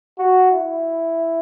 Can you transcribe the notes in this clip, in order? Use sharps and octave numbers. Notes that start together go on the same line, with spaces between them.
F#4
E4